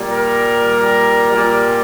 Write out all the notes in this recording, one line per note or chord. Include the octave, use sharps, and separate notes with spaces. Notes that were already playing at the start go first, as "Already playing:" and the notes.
Already playing: A#2 G3
A#4
A#2 G3